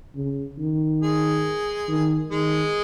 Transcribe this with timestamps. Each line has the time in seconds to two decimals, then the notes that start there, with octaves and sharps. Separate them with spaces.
0.15 C#3
0.59 D#3
1.02 G#3 G#4
1.88 D#3
2.31 D#3 G#3 G#4